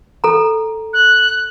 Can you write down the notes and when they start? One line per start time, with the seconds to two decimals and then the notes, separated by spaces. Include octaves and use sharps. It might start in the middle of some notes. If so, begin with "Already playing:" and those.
0.24 A4 A#5
0.93 F#6